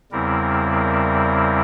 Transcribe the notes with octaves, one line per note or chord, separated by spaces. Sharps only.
E2 C#3 G3 C4 E4 A#4
A#4